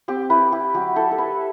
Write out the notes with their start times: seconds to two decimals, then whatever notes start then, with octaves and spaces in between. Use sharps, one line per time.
0.08 C4 G4
0.30 E4 B4
0.52 E4 G4
0.74 F#3 G4
0.96 E4 A4
1.11 A4
1.18 E4 B4